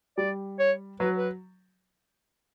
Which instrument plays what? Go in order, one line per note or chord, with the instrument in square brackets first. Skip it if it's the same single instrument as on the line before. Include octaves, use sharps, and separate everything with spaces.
[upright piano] G3 [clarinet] D5
[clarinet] C#5
[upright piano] F#3 [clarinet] B4
[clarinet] B4